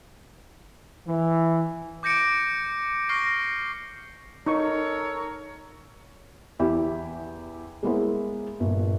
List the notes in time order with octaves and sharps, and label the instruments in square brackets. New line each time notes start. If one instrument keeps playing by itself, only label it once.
[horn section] E3
[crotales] D6 G6 A#6 C#7 D7
C#6 F6 A#6 C7
[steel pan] D#4 C#6 [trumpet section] A4 A#4 C#5
[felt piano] E2 E4 G4
G#3 A#3 B3 E4 G#4 C5
G1 A#2